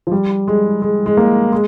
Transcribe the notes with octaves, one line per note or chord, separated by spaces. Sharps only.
F3
G3
G#3
G#3
G#3
A#3
G#3